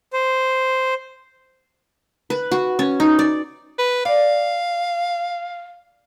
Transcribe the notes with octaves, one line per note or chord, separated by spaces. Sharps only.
C5
B4
F#4
C#4
D#4
D5
B4
D5 F5